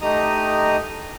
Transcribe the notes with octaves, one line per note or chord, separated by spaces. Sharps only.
A3 D#4 G4 D#5 A#5 D#6